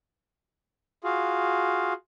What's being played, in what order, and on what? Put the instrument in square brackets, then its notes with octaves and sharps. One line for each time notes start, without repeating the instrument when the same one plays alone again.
[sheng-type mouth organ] F4 F#4 G#4 F5